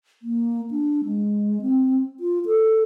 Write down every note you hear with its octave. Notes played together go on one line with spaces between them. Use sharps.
A#3
D4
G#3
C4
F4
A4